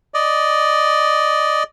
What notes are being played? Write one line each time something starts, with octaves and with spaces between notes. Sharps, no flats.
D5 D#5